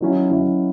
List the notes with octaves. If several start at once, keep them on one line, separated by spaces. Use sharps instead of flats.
D#3 F#3 C#4 E4
D#3 F#3 C#4 E4